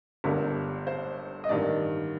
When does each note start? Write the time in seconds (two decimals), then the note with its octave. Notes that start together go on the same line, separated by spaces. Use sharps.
0.24 G1 G2 D3 A#4
0.87 C5
1.44 D#5
1.49 A1 G2 D#3 D5